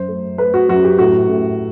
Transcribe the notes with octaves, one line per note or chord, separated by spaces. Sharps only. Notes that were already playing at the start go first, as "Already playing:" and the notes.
Already playing: F#2 C5
A3
A3 B4
F#4
F#2 F#4
G4
A2 F#4
A2